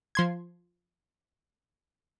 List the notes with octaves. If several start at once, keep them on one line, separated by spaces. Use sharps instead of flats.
F3 C6 G#6